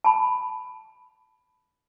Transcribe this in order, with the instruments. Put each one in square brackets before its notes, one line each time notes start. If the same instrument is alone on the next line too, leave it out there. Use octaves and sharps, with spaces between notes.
[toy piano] A5 B5